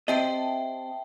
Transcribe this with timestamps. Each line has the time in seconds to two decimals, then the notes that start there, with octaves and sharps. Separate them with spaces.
0.08 C4 G4 D#5 E5 G5 A5